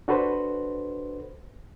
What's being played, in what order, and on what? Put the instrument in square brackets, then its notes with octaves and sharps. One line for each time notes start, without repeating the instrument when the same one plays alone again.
[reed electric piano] D4 F#4 A4 B4 C5